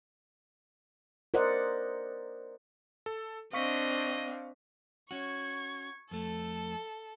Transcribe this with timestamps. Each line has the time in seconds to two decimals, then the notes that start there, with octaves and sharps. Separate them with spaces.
1.34 A#4 C5 D5 D#5 F#5
3.06 A4
3.53 C4 D4 D#5 F5 C#6 B6
5.11 C#4 F#4 C#6 G#6
6.11 F2 A3 A4